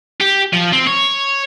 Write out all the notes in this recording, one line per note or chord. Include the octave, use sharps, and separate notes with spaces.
G4
F3
C4
C#5